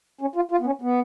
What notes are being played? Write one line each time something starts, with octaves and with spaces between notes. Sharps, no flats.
C#4
F4
F4
B3
C#4
B3